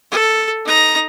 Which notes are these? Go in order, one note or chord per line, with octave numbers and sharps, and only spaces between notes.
A4
D#4 A#5